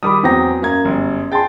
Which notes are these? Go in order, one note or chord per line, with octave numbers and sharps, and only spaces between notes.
D#3 G3 B5 D6 D#6
E2 F#3 C4 G5 A#5 A#6
F#2 A#3 A#5 G#6
G1
G#4 G5 A5 C6 A6